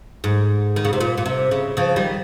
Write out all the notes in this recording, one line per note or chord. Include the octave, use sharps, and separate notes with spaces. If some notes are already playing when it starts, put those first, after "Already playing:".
G#2
D#3
C#3
C3
A#2
A#2
C3
C#3
C#3 F3
D#3 G3